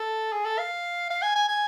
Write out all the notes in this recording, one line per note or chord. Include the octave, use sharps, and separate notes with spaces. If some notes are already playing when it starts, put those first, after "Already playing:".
Already playing: A4
G#4
A4
F5
F5
G#5
G#5
G#5